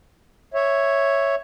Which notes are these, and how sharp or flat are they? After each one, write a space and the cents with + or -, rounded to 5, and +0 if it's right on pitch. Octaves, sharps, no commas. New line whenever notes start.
C#5 +0 E5 +0